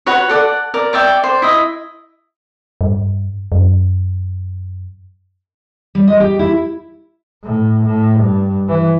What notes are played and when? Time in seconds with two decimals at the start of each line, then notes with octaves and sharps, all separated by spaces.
0.06 F#4 B4 C#5
0.29 A4 D5 F#5
0.74 A#4 D5
0.93 C#5 D5 E5 G5
1.24 C5 D5
1.42 E4 D#5 E5
2.81 G2
3.52 F#2
5.95 G3
6.07 D#5
6.20 G4
6.39 E4
7.44 A2
7.85 A2
8.20 G2
8.69 E3